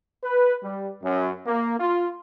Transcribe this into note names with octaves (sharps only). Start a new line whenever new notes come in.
B4
G3
F#2
A#3
F4